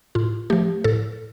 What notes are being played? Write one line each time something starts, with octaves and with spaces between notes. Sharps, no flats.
A2 F4
F3 A3 G4
A2 A4